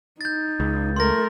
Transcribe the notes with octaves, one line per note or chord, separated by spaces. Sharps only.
D#4 G6 A6
C#2
A3 A#4 C6 A#6